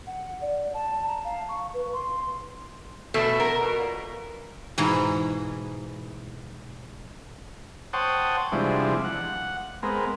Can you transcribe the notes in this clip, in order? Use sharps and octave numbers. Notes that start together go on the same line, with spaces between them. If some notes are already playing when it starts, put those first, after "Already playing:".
F#5
D5
A5
A#5
F5
C#6
B4
C6
E2 B2 A3 B3
A#4
B2
A#2
G#2 B2 E3 G#4 A#5
C5 C#5 F#5 G5 A5 D#6
C3 E3 F3 G3 G#3 D4
F#5
G#3 B3 C4 A#4